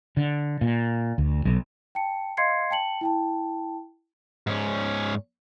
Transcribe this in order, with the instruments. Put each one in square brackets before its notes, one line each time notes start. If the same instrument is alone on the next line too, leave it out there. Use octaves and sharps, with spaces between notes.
[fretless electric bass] D3
A#2
D2
B1
[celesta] G5 A5 C#7
D#5 F5 C6 G#6 C7 C#7
G5 A5 C#7 F#7
E4 G5 A5
[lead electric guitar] G#2 C#4